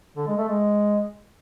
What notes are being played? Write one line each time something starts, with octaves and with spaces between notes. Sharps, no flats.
D3
G#3
A3
G#3